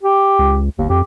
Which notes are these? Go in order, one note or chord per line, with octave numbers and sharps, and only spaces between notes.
G4
C#2
G1 D#2
F2 G4